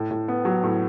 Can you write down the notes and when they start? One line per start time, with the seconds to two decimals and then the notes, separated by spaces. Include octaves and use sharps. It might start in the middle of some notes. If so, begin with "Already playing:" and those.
Already playing: A2
0.11 A2
0.28 B3
0.45 F#3
0.63 A2